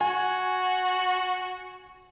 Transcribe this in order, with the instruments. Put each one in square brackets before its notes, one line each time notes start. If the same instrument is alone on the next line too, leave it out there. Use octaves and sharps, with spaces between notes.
[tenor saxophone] F#4 [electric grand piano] G#5